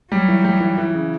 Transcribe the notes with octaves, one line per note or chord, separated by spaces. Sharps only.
F#3 G3
E3
G3
E3
E3
C#3